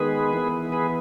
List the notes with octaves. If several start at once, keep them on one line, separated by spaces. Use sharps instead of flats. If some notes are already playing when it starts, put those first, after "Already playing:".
Already playing: D#3 G#3 B3 G#4 B4
E3 B3
G#4 B4